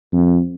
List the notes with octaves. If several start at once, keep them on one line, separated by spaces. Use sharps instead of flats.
F2